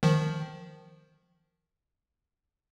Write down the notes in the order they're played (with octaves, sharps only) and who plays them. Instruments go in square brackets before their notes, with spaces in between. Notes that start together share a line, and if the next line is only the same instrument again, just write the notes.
[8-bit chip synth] D#3 F3